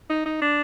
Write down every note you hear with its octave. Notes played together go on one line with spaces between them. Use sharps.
D#4
D#4
D4